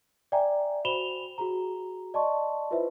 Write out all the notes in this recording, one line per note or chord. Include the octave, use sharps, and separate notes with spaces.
D5 E5 G5 G#5 A#5
F#4 C5 B5 E7 F7 G7
F#4 G#4 A#5
D5 D#5 A5 C6 C#6
E4 F4 B4 C5 E5